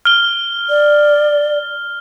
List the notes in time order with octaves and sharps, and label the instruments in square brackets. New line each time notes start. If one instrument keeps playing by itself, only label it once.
[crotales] F6 G7
[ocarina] D5